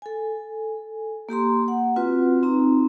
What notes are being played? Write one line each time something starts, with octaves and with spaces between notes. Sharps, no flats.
A4 G#5
A#3 G4 A#5 C6
F#5
C4 F4 F#4 B4
C4 D#4 A#5